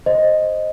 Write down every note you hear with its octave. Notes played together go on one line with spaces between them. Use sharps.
C5 D#5